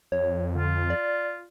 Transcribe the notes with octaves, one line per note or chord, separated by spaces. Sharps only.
F2 C#5
D3 F4
D5